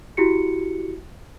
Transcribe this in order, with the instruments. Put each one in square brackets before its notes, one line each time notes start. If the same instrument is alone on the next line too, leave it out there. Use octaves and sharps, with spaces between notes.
[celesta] E4 F#4 G4 C#7